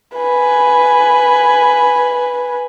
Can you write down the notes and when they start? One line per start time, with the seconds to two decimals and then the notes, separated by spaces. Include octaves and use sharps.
0.17 B4 G#5